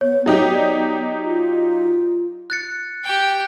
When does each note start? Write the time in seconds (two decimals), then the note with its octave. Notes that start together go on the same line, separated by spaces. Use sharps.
0.01 B3 C#5
0.26 F#3 B3 D#4 G4
0.54 D5
1.23 F4
2.50 F#6 A6 C#7
3.04 G4 G5